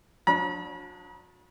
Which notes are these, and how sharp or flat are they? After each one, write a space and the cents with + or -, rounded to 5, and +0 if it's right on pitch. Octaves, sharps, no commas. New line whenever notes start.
F#3 -40 D4 +0 B5 -45